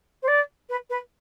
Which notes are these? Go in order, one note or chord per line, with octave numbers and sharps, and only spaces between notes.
C5
D5
B4
B4